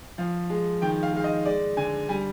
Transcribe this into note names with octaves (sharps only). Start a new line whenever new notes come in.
F3 F5
G#3
D#3 G5
F5
G#3 F5
D#5
G#3 D5
D3 G#5
G3 G#5